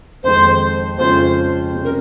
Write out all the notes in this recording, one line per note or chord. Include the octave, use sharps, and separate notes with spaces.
F2 D#3 G#3 C5
F2 C#3 G#3 C#4 F4 C5
C3 G3 C#4
A#4